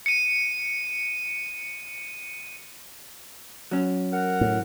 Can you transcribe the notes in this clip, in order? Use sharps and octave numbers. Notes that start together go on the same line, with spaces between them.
C#7 D#7
F#3 C#4
A#4 F#5
A2